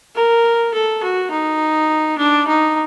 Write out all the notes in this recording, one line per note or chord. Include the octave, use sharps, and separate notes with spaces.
A#4
A4
F#4
D#4
D4
D#4